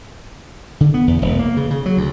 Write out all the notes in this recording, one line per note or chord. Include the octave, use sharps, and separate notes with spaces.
D3
B3
E2
E1
A#3
C#3
C#3
F#3
D2